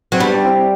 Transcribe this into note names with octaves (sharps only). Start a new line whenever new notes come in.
F#3 C4
G3 B3 D4
D4
C4 E4